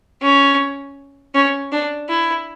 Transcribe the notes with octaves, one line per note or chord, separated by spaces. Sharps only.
C#4
C#4
D4
E4